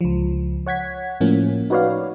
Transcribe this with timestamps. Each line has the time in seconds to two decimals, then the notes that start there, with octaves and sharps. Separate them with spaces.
0.01 C#2 F3
0.67 C#5 F#5 G#6 B6
1.21 A2 F3 A#3 C#4
1.70 D#4 F#4 B4 C#5 D5 F5